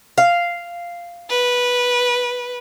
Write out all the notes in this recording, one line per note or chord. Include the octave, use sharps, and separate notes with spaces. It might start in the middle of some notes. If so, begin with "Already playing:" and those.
F5
B4